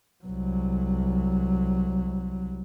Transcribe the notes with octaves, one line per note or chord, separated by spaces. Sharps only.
C2 F#3